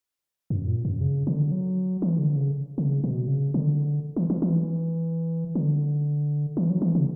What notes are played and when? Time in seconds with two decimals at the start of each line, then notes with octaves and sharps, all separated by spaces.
0.50 F#2
0.67 A#2
0.85 F#2
1.01 C#3
1.27 D3
1.52 F#3
2.02 E3
2.18 D3
2.36 C#3
2.78 C#3
3.04 B2
3.28 C#3
3.54 D3
4.16 E3
4.30 E3
4.42 E3
5.55 D3
6.57 E3
6.70 F#3
6.82 E3
6.95 C#3